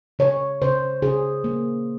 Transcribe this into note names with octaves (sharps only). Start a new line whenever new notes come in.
C#3 C#5
C#3 C5
C#3 G#4
A#3